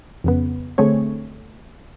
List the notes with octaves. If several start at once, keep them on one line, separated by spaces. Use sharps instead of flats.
F2 C#3 B3
D3 A3 C4 G#4 C#5